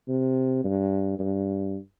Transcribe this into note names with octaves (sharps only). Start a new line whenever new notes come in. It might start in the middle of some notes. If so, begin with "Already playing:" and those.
C3
G2
G2